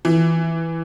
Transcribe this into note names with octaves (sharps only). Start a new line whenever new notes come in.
E3